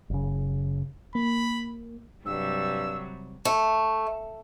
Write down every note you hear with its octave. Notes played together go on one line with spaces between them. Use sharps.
F#1 C#3
A#3 B5
G2 C3 F#3 G3 E6
A3